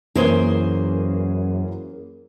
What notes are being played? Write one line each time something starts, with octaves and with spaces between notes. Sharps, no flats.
F#2 E3 A#3 C#4 G#4 C5 G7